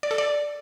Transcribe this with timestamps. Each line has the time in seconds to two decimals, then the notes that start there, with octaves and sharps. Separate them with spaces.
0.03 D5
0.11 A4
0.18 D5